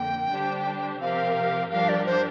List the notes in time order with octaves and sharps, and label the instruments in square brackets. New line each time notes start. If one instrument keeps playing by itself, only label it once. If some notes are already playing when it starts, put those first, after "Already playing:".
Already playing: [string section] F2 D3 A#3 [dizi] G5
[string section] D3 G3 D4 G4 C5
[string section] C3 F3 C4 G4 A#4 [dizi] F5
[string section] G2 F3 D4 G4 A#4 [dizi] F5
[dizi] D5
C5